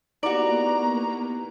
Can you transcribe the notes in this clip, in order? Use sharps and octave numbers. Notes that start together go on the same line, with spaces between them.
A#3 B3 D#4 E4 F#4 G4 D5 A#5